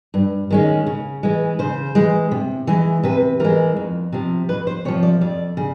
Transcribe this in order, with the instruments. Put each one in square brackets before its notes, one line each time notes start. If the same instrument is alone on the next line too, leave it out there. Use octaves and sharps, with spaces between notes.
[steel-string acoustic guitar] G2
D#3 G#3 C#4
C#3
E3 G#3
C#3 C5
E3 G#3
C3
E3 G#3
C3 B4
E3 G#3 A#4
F2
C3 F3
F2 B4
C5
C3 C#5
F3
D5
F2 D5
C#3